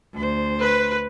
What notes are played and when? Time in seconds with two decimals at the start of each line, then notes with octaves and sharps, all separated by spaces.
0.14 D2 C5
0.60 B4